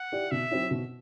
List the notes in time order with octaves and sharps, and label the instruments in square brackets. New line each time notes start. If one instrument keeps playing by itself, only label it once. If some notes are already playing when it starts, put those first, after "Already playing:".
Already playing: [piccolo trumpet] F#5
[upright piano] E4 G4 D5
[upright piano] B2 [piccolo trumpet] E5
[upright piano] F#3 C4 E4
B2